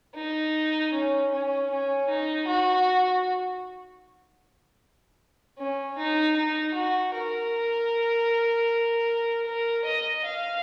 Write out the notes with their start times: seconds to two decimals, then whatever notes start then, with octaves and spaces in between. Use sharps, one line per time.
0.14 D#4
0.93 C#4
1.31 C#4
1.70 C#4
2.09 D#4
2.47 F#4
5.58 C#4
5.98 D#4
6.36 D#4
6.74 F#4
7.14 A#4
9.46 A#4
9.85 D#5
10.24 F5